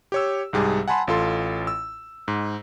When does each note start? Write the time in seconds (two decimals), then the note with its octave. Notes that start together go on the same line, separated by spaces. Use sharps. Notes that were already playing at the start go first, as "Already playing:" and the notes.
0.12 G4 C#5 E6
0.53 C2 G#2 G3 G#4 A5
0.88 F#5 G#5 A5 B5 C6
1.07 A1 F4 A4 C6
1.67 E6
2.28 G#2